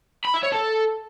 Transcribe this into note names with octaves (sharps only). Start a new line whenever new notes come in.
B5
E5
C#5
A4